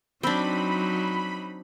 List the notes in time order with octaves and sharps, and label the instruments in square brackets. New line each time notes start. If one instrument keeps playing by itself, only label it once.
[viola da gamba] F#3 D#4 [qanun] C4 D4 [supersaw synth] B5